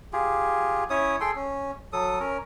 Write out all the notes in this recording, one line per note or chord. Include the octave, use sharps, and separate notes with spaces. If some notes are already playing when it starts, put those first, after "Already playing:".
F4 G4 G#4
C#4 E4 C#5 D#6
G#4 A4 G5 C6
C#4
F#3 A4 D#6
C#4 A#4